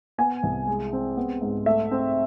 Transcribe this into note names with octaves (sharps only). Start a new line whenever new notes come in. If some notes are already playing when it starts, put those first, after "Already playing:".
B3 G#5
C2
G#3
C4
B3
G#2
A3 E5
C4